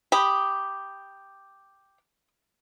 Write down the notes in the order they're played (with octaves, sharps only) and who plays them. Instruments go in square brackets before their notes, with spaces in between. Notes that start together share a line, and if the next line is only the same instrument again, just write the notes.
[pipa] G4 [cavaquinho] B5 D#6